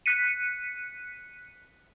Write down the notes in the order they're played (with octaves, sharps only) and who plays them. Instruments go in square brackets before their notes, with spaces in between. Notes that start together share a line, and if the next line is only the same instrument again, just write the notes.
[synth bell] F#6 B6 C#7 D#7